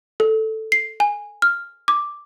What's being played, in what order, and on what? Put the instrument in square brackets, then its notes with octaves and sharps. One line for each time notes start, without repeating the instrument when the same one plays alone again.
[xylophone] A4
C7
G#5
F6
D6